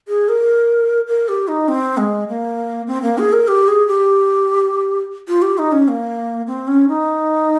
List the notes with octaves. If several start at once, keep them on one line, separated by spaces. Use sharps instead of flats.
G#4
A#4
A#4
G4
D#4
C4
G#3
A#3
C4
A#3
G#4
A#4
G4
G#4
G4
F4
G4
D#4
C#4
A#3
C4
C#4
D#4